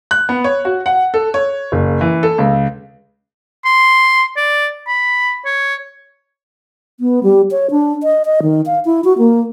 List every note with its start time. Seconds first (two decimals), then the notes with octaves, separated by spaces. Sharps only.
0.11 F#6
0.29 B3
0.44 C#5
0.65 F#4
0.86 F#5
1.14 A4
1.34 C#5
1.72 F#1
2.01 E3
2.23 A4
2.38 C#2
3.65 C6
4.36 D5
4.88 B5
5.46 C#5
7.00 B3
7.23 G3
7.51 C#5
7.71 D4
8.03 D#5
8.25 D#5
8.43 D#3
8.66 F5
8.85 E4
9.04 F#4
9.18 A#3